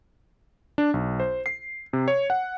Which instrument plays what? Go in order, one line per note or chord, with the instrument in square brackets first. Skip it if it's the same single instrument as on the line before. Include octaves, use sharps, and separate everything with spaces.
[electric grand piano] D4
B1
C5
C7
C3
C#5
F#5